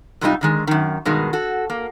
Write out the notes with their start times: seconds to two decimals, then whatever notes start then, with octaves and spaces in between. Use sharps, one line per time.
0.21 G#2 C3 G3 C4 D#4 F4
0.41 D3 D#3 G#3
0.67 F#2 D#3
1.05 G2 B2 D#3 G#3
1.33 F#4 A4
1.70 A#3